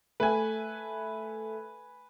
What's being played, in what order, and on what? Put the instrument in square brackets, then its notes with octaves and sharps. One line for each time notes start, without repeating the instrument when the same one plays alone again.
[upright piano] A3 [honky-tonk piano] B4 G#5